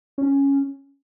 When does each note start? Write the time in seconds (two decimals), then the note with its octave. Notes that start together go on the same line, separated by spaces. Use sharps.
0.18 C#4